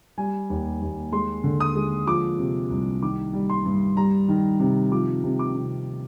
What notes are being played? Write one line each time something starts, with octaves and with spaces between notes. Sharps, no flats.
G3 G#5
D#2
D#2
G#3 C6
D3
D#6
G#3
F3 D6
C3
C2
D#3 D6
G3
C6
G2
G3 A#5
D#3
C3
F3 D6
C3
D6
C3